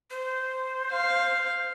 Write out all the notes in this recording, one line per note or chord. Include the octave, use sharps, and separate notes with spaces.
C5
F5